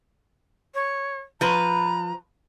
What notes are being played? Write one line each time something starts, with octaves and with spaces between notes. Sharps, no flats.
C#5
F3 B4 A#5